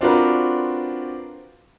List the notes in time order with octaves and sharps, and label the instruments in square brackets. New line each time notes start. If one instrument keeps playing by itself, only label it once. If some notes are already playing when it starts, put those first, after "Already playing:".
[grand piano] C4 D4 F4 F#4 A#4 B4